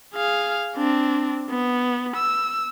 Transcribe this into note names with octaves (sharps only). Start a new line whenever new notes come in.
G#4 F5
C4 D4
B3
E6